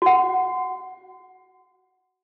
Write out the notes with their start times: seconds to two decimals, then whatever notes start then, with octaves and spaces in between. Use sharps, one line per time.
0.02 F#4 F#5